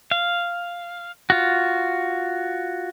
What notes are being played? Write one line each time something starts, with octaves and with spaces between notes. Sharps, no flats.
F5
F4 F#4